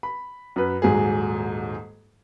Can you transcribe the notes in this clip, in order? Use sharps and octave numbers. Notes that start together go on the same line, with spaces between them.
B5
F#2 B4
D#1 G#2 F#3 G#4